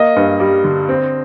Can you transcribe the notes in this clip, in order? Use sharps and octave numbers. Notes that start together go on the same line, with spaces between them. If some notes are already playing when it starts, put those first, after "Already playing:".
Already playing: A#3 D#5
G2
G3
D3
C4